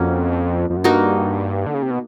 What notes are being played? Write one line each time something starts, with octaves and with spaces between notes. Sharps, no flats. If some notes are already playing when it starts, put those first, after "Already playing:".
Already playing: F2 A#3 C#4 F#4
F2
F#2
G2 A#3 D#4 F#4
D3
C#3
C3
B2